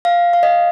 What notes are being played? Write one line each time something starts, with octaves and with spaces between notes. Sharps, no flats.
F5
F5
D#5